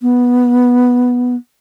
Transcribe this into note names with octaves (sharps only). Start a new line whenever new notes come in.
B3